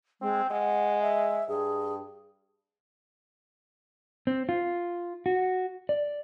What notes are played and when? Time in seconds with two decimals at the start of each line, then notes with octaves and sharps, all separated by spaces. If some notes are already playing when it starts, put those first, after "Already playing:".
0.21 G#3 C4
0.51 G#3 F#5
1.02 E5
1.49 G2 G#4
4.27 C4
4.49 F4
5.26 F#4
5.89 D5